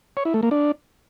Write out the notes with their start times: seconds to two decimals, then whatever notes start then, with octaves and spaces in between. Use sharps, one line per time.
0.17 C#5
0.25 E4
0.34 A3
0.43 A#3
0.51 D4